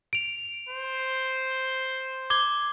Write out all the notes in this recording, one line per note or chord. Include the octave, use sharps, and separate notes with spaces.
D7 F7
C5
D6 G#6 G7